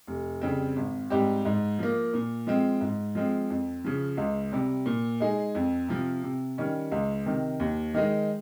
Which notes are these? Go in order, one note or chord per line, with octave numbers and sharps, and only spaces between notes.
F1
F2 C#3 G3 C4
G#1
G#2 G3 C4 G4
G#2
F3 A#3
A#2
F3 G#3 C4
G#2
F3 G#3 C4
F2
C#3 F3
C#2
C3 G3
A#2
G#3 D#4 G#4
F2
C3 F3
C3
D#3 G3 C#4
C#2
C3 D#3
D#2
D#3 G#3 D#4